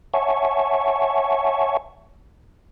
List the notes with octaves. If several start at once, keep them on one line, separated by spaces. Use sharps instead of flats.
C#5 E5 F#5 G#5 A5 C#6